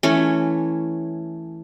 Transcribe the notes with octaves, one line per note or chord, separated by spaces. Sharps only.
E3 A3 C#4